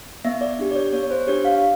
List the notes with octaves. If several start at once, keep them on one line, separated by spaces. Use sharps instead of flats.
B3 E5
D5
D4 G4
D5
C#5
B3 C#5
C#5
C5
D4 G4 C#5
F5
F5